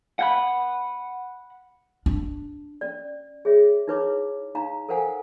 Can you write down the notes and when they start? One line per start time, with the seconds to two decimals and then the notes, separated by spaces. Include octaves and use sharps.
0.19 F#5 G5 B5
2.06 D4
2.81 C#4 D5
3.45 G#4 C#5 E5
3.88 D#4 E4 B4 C#5 D6
4.55 D#4 F5 A#5
4.89 A4 A#4 C5 F5 F#5 G#5